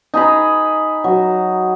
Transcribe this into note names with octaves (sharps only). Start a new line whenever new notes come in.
D#4 G#4 A#5 B5
F#3